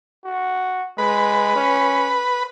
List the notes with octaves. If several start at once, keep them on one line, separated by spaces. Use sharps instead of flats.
F#4
G#3 B4
C#4